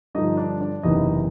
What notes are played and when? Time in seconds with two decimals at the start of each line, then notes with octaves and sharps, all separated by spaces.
0.15 G2 D3 F3 D#4 D#5
0.37 D4 D5
0.60 D4 D5
0.83 F#1 E2 C3 E3 D#4 D#5